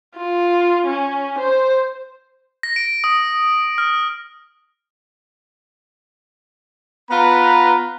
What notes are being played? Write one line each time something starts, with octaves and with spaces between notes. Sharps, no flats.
F4
C#4
C5
A#6
D7
D#6
F6
B3 F4 B4 A#5